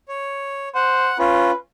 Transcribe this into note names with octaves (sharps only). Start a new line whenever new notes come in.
C#5
C5 F#5
C#4 F4 B4